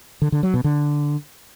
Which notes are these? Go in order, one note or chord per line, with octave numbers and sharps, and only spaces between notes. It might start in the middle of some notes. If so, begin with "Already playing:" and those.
D3
D3
F#3
B2
D3